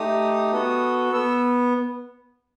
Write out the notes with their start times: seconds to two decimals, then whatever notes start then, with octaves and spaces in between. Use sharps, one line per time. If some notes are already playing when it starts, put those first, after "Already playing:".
Already playing: A3 D#4 G4 D#6
0.52 B3 F#4 A4
1.12 B3 E6